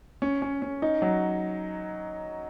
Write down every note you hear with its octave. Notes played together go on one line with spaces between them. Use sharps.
C#4
C#4
C#4
D#4
F#3